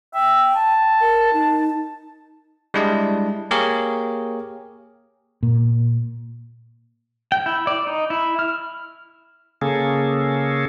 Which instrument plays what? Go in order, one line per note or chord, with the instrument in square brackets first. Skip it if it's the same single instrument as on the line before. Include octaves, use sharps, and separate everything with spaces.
[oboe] E5 [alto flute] G5
[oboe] A5
[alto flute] A#4
D#4
[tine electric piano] G3 G#3 D4 E4 D#5
A#3 G4 G#4 A#4 C#5
[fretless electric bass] A#2
[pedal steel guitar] G5
E4
D5
D#4
E4
F6
[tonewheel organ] C#3 A#3 C#4 G#4 A4